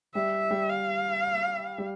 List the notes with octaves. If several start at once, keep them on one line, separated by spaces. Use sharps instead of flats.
G3 E5
G3
F5
G3